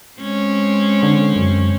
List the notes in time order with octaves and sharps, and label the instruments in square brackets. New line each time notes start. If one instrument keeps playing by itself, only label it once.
[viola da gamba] G#3 C4 C#4
[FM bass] D3
F#2